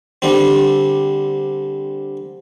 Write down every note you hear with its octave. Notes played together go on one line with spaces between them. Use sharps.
D3 G3 C4